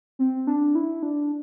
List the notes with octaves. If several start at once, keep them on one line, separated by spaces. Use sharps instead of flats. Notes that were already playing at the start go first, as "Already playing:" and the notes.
C4
D4
E4
D4